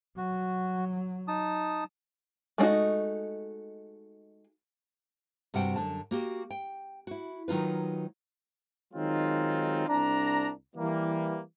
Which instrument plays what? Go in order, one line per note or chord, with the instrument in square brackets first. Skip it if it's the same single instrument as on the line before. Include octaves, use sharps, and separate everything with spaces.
[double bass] F#3 [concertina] F#4
[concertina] D#4 A5 D#6
[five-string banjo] G#3 A3 D4 D#4 F#4
[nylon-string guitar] G2 C3 G3 F#4 F#5 G5
F#2 D3 A5
A#3 F#4 G4
G5
E4 F#4
D#3 F#3 D#4 F4 B4
[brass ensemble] D#3 F#3 G#3 C4 D#4 F4
C2 D4 A#5
E3 G3 A#3